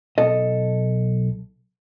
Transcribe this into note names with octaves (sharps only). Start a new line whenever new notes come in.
B1 A4 D#5